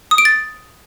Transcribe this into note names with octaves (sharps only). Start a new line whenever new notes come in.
D#6
D7
A6